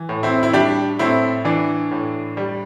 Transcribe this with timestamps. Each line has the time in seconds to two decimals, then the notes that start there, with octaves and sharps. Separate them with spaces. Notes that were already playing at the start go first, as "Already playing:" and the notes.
Already playing: E3
0.09 A2
0.23 C4 E4
0.43 E4
0.53 G3 D4 G4
0.99 A2 C4 E4
1.45 E3 D4
1.91 A2
2.37 G3